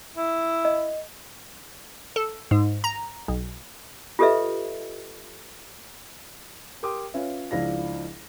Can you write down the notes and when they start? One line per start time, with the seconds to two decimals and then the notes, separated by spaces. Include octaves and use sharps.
0.16 E4
0.65 D#5
2.16 A4
2.51 G#2
2.84 A#5
3.28 B1
4.19 F4 G4 A4 B4 D#5 E5
6.83 G4 A#4 G5 C6 D6 D#6
7.14 C#4 F4 B4 E5
7.51 C#2 F3 D4 E4 F5 A#6